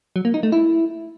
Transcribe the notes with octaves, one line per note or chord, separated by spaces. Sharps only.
F#3
A#3
D#4
A3
E4